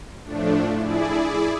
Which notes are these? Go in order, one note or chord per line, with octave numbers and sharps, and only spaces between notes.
A2 F3 A3 D4
E4 G#4 D5